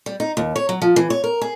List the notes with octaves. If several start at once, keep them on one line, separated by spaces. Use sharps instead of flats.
G3
D#4
D#2
C#5
F#3
F3
E3
C#5
A#4
G#4